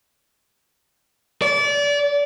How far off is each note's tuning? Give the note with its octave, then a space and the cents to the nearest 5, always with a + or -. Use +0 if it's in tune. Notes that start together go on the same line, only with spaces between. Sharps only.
D5 -30